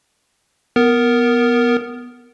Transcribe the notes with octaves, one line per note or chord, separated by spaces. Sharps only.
B3 A#4